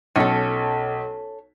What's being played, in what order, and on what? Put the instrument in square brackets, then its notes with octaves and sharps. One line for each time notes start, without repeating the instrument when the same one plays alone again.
[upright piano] B1 [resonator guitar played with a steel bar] C#4 A4